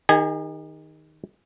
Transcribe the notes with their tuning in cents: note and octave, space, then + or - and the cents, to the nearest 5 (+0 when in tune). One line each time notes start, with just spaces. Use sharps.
D#3 +0 G#4 -45 G#5 +0